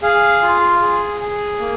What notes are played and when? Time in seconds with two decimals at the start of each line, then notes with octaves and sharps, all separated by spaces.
0.02 G#4 F5
0.42 F4
0.82 G#4
1.20 G#4
1.60 A#3